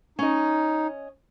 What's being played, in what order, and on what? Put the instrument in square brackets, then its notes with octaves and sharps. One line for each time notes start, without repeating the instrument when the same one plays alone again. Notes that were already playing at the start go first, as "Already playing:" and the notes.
[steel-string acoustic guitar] C#4 D#5 [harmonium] D#4